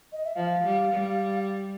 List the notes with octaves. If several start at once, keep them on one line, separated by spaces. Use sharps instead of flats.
D#5
E5
F3 F5
G3
G3